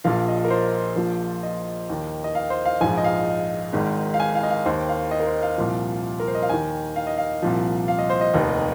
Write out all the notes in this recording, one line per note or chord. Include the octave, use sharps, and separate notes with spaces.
A#1 A#2 F3 F5
D#5
A#4
C5
A#1 A#2 F3
D#5
D#2 D#3
D#5
F5
C5
F5
A#1 G#2 F3 G#5
D#5
F5
G#1 G#2 D#3
F5
G#5
F5
D#5
F5
D#2 D#3 C5
F5
D#5
A#4
C5
F5
C2 A#2 F3
A#4
C5
D#5
F5
D#2 D#3 G#5
F5
D#5
F5
C2 A#2 F3
F5
D#5
C5
D#5
F1 D#2 D#3